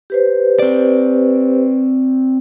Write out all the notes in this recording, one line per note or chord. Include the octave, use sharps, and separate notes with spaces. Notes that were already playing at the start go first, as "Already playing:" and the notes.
G4 B4 C5
C4 D5